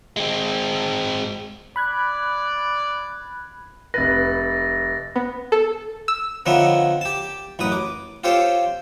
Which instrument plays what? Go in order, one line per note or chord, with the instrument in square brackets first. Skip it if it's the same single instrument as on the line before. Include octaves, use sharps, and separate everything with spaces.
[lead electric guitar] G#3 C4
[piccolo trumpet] D5 [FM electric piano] B5 F#6 G#6
[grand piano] F1 B4 [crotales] A6 A#6
[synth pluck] B3
A4
E6
[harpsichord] D3 D#3 F3 B3 C#5 E5
G4 A5
A1 F#2 B4 D#6
D6
F4 G4 A4 C5 C#5 G5